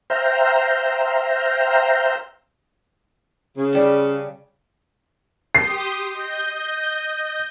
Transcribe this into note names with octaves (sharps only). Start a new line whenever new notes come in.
C5 E5 F5 G5 A#5
C#3
G3 A5
G4 C6 D#6 C7
D#5 G6